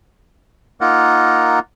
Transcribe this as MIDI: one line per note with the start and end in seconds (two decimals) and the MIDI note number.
0.81 1.59 58
0.81 1.59 63
0.81 1.59 65
0.81 1.59 70
0.81 1.59 78